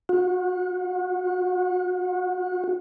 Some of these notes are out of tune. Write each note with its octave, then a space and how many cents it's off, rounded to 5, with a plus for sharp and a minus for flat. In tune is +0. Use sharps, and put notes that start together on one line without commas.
F#4 -35